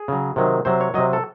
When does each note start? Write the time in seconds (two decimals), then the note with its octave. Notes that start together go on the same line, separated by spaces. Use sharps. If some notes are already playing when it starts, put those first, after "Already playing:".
Already playing: G#4
0.08 C#3 F#3
0.36 C3 D#3 F#3
0.65 C3 F#3 C5
0.81 C#5
0.94 C3 F#3 D#5
1.13 A4